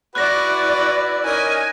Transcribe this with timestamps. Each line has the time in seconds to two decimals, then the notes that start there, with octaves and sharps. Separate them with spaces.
0.15 E4 F#4 B4 D5 F#6 A#6
1.25 C#4 D#4 A#4 G#5